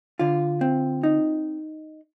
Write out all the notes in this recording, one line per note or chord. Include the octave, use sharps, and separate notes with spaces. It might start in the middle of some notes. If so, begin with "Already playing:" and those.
D3 F4
C4
D#4